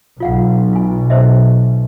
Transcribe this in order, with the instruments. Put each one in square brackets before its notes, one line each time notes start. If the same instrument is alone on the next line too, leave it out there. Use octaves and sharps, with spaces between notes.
[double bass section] B1 [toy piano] F4 F5 F#5
[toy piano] F4 G#5
C5 D#5 E5